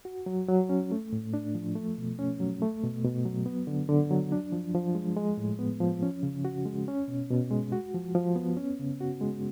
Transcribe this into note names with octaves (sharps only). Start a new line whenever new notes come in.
F#4
F#3
F#3
C#4
A3
A2
D4
F3
A3
B2
C#4
F#3
A3
B2
B2
F#3
B3
D3
D3
F#3
D4
F3
F3
G#3
G#3
A2
B3
F3
C#4
C#3
F#4
G#3
C#4
B2
B2
G#3
F#4
F3
F3
B3
C#4
C#3
F#4
G#3